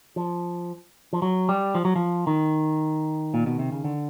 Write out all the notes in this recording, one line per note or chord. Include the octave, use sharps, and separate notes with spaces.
F3
F3
F#3
G3
F3
F#3
F3
D#3
A#2
B2
C3
C#3
D3